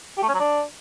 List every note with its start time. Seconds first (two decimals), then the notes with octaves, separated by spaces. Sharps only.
0.17 G4
0.23 A3
0.29 C#4
0.34 F#3
0.40 D4